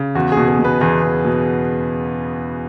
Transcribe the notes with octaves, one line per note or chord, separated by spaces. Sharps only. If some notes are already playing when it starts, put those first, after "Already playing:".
Already playing: C#3
E2 F#4
G#4
B2
G#4
B2
B3 B4
E2 G#4
E2
B2